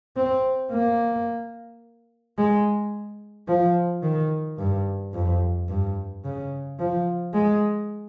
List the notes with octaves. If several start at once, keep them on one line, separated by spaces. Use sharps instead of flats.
C4
A#3
G#3
F3
D#3
G2
F2
G2
C#3
F3
G#3